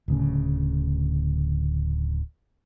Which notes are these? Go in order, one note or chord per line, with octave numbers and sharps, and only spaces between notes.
D1 D2 C#3